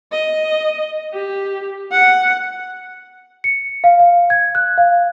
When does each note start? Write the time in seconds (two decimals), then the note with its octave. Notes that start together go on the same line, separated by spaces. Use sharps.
0.12 D#5
1.14 G4
1.91 F#5
3.44 C#7
3.84 F5
4.00 F5
4.30 G#6
4.55 F#6
4.78 F5